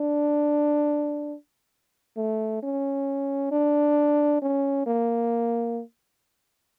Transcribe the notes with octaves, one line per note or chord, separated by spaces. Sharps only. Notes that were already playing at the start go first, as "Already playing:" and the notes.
Already playing: D4
A3
C#4
D4
C#4
A#3